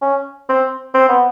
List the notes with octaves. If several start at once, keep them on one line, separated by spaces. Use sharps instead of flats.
C#4
C4
C4
B3